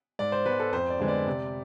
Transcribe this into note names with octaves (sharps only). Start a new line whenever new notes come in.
G#2 D5
C5
G#3 B3 B4
A4
F2 C5
D5
D3 G#3 B3
D5
C3